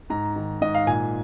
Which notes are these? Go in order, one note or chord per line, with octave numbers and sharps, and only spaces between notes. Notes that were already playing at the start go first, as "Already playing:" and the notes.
G#2 A#5
D#3
G#2 D#5
F5
A#2 G#5